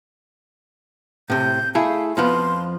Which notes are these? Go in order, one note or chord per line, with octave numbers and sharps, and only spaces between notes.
A2 C3 G6
A3 E4 G#4 F5
F2 F3 B3 C6